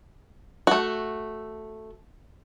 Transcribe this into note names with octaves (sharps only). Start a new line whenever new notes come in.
A3 F#4